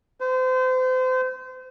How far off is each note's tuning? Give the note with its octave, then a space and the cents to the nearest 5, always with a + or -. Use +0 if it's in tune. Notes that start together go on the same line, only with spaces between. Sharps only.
C5 -35